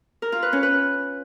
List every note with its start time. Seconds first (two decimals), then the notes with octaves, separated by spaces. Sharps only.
0.22 A#4
0.32 F4
0.42 B4
0.53 C#4
0.63 B4